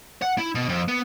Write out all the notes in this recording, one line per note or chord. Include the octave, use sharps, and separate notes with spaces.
F#5
E4
B2
F2
B3